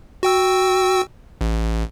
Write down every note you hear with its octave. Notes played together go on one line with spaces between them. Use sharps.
F#4 G5 E6
A1